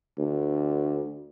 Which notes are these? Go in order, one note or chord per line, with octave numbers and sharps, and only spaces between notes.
D2